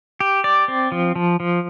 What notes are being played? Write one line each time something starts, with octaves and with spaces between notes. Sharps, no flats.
G4
D5
C4
F3
F3
F3